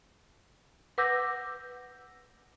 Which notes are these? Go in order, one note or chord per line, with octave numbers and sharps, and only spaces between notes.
B4 F#5 D6 E6 G6 A#6